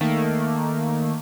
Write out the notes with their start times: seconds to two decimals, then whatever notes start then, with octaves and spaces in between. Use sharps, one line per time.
0.01 D#3 A3 A#3